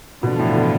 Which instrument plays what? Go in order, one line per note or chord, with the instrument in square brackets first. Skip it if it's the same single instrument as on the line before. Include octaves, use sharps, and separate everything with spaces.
[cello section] E2 D3 F3 B3 F4 [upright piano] B2
[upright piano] A2
B2